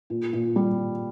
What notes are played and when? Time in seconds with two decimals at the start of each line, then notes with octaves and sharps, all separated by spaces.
0.10 A#2
0.33 A#2
0.56 G3